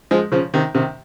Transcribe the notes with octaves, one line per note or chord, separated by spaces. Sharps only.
F3 G#3
C#3 F3
C3 D#3
C3 D#3